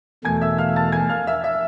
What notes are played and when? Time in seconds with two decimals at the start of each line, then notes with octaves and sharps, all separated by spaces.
0.24 E2 B2 A3 G#5 G#6
0.42 E5 E6
0.58 F5 F6
0.76 A5 A6
0.92 G#5 G#6
1.09 F5 F6
1.27 E5 E6
1.43 E5 E6